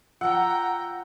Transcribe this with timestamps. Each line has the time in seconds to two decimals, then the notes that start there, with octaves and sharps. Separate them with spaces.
0.21 F3 F#5 G5 A#5 E6